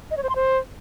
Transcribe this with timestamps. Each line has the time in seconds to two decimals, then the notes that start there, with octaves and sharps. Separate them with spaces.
0.11 D#5
0.17 C#5
0.23 C5
0.29 C6
0.36 C5